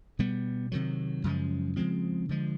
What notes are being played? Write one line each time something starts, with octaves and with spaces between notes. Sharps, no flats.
B2 G3 B3
C3 D#3 F#3
F#2 C#3 F3 G#3
C#3 F3 G#3 C4
D3 F3 G#3